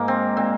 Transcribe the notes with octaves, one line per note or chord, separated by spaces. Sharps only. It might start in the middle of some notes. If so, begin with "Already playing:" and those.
Already playing: G#2 A#3
C4
A#2 C4